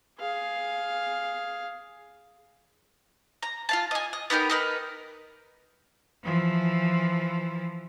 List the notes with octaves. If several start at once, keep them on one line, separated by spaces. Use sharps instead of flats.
G#4 F5
A#5
F4 F5 A5
D#5 G#5
D#5
B3 D#4 G4 A#4
D#4 A#4 B4
E3 F3